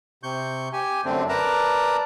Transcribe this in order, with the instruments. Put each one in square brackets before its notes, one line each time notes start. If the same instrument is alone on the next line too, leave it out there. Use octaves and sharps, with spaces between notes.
[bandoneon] C3 C#6 G6
G4 G#5
F#2 D3 A3 C4 D4
A#4 B4 D5 A5 A#5